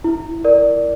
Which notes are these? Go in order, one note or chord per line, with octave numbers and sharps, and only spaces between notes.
E4
A#4 D5